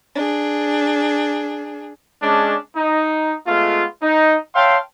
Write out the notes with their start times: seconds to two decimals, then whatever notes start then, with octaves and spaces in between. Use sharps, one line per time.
0.16 D4 G#4
2.23 G#3 C#4 D4
2.77 D#4
3.47 G#3 A3 B3 F4
4.03 D#4
4.55 C#5 E5 F5 G5 A5 C6